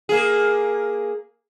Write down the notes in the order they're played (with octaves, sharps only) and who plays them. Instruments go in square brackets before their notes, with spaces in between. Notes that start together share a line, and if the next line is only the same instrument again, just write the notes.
[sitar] A#3 G#4